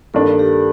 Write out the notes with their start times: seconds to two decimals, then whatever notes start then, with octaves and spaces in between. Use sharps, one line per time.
0.14 G2 D#3 A#3 D4 A4
0.39 G4